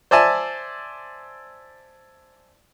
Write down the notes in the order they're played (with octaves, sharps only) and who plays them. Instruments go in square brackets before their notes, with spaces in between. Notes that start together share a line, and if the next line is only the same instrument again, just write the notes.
[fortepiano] C5 D5 E5 G#5 A5